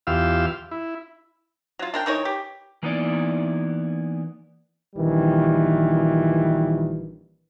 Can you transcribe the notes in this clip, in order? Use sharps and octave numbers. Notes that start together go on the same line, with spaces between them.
E2 F4 G4 F5 E6
E4
F#3 F4
D4 A#4 G5
E3 D#4 A#4 C#5
G4
E3 A#3 B3 D#4 E4 D5
A#1 D#3 E3 G3